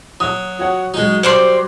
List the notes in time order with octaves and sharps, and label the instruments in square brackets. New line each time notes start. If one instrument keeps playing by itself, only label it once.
[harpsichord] F#3 [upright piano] D#6
[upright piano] F#4 C#5 F#5
[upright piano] F#3 F#4 [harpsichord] G#3 D#4
[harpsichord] G3 [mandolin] C5 D5 C6